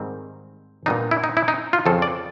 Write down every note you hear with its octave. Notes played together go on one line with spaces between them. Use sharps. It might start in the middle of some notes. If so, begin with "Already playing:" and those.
Already playing: G#2 D#3 G3 C4 D#4
A#2 G3 B3 D4 D#4
E4
D#4
E4
D#4
F4
F2 C#3 F3 A4
D5